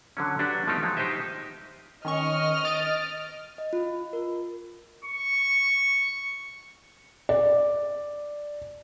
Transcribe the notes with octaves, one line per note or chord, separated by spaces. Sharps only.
D3 F#3 C#4
F#3 D4 F#4 G4 B4
F3 A3 B3 D#4 F4 G4
F3 F#3 G#3
D#4 G4 C5 D#5 E5
D#3 C#4 D#5 C#6 F6
D#6 A6 D7
D#5
F4
A#4
C#6
D5